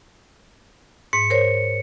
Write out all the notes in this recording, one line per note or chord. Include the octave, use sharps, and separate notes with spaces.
G#2 C#7
A#4 C5 C#5